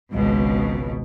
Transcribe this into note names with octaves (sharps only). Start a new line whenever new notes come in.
G#1 C#2 B2